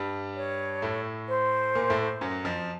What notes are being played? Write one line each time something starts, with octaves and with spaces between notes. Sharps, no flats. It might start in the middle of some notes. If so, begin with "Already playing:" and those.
Already playing: G2 G3
C#5
A2 A3
C5
A#2 A#3
A2 A3
F#2 F#3
F2 F3